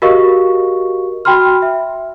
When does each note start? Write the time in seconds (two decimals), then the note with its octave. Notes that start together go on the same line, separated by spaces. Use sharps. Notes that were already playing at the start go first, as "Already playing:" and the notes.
0.02 F#4 G4 A#4 D#5 F5 C#6
1.25 F#4 G5 B5 C6 F6
1.62 E5